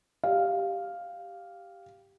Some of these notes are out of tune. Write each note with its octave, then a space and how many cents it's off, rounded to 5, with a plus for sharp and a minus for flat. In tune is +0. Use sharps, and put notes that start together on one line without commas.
G4 +0 F5 +0